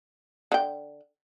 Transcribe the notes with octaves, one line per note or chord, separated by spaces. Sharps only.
D3 G5